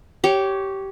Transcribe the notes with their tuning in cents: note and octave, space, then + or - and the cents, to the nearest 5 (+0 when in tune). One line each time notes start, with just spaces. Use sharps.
G4 -15 C#5 +0